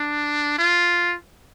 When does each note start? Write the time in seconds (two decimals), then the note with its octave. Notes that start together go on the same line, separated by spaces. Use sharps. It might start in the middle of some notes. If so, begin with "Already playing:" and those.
Already playing: D4
0.58 F4